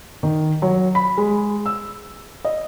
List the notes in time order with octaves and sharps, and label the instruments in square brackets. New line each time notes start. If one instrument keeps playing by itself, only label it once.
[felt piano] D#3
F#3
B5
G#3
E6
D#5